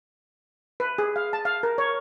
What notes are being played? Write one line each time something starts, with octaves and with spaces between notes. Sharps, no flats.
B4
G#4
F5
A5
F5
A#4
C#5